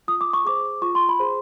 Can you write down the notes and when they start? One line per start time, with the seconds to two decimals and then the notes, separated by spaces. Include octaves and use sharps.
0.08 F4 D#6
0.21 D6
0.33 C#6
0.45 G#4 C5 D6
0.82 F4 C#6
0.95 C6
1.09 B5
1.19 G#4 C5 C6